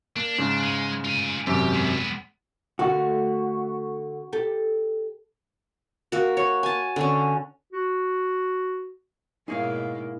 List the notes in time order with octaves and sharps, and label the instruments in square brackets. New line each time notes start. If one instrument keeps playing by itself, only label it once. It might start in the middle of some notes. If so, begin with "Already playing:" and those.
[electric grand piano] A#3 [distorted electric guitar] D4
[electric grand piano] G#2 C#3
[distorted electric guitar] G#3
F4 G#5
[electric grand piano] G#1 F#2 C3 [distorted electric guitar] G4
[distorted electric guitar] G#3 B3
[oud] D3 A3 A#3 [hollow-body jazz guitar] F#4
[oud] G4 A4
[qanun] A#3 F#4
C#5
G#5 A5
D3 C#4
[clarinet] F#4
[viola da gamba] G#2 B2 A#3 [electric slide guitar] D#4 E4 [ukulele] G#4 C#5 F5